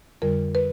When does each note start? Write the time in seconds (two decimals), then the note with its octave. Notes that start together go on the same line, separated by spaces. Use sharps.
0.22 F2 D3 G3 A#4
0.55 B4